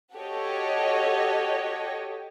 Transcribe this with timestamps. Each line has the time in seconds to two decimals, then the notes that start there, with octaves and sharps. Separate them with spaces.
0.14 F#4 G4 A4 C#5 D#5